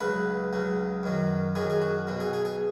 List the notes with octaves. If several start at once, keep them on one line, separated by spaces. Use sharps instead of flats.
C#2 C#3 F#3 B4
C#2 C#3 F#3
F#2 D#3 F#3
F#2 D#3 F#3 G#4
G#4
F#4
B1 B2 F#3
G#4
G#4
G#4